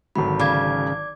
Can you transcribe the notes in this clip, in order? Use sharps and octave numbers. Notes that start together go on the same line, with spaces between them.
G#1 D3 F#3 B5
C#3 D5 D6 G#6